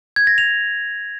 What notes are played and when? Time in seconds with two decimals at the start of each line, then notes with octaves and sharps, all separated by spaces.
0.16 G#6
0.27 A#6
0.38 F7